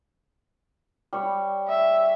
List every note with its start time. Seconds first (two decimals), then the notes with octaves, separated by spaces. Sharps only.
1.13 G3 C#5
1.68 E5